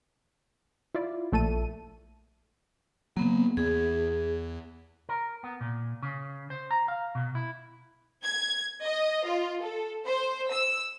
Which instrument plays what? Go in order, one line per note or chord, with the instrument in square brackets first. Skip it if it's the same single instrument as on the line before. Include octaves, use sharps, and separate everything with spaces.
[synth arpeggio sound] E4 F4 D5
A#1 A3 A4 D#7
[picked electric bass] C#3 F#3 [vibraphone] A#3 B3
[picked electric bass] E2 B3 [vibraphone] G#4
[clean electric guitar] A#4
B3
A#2
C#3
C5
A#5
F5
B2
E4
[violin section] G#6
D#5
F4
A4
C5
E6